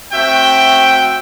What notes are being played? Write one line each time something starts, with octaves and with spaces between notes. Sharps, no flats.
A3 C4 F#4 E5 G5